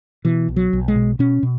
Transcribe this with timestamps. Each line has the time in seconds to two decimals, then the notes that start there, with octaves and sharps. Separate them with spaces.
0.25 B2 E3
0.48 B1
0.56 F#3
0.73 B1
0.88 G#3
0.96 B2
1.19 B2 C#4
1.43 B2